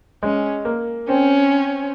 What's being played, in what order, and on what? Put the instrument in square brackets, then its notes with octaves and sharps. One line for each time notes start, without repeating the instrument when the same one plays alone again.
[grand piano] G#3 [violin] C#4
[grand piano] A#3
[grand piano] C4 [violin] C#4